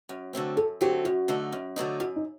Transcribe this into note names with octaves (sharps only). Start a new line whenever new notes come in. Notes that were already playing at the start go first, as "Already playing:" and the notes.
F#2
D3 F#3 A3 C4
F#2 A4
D3 F#3 A3 C4 G4
F#2 F#4
D3 F#3 A3 D#4
F#2
D3 F#3 A3 D#4
F#2 F#4
D#4